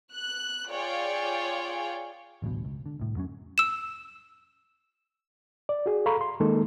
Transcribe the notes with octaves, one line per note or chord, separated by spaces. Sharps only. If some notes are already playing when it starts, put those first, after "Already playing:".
F#6
F4 G#4 C#5 D5 F5 G5
A1 D2 G2 B2
C#2
D3
C2 A2
F2 F#3 B3 C#4
E6 E7
D5
F#4 G#4
A4 F5 A#5 B5 C#6
C6
D#3 G#3 A#3 D#4 A4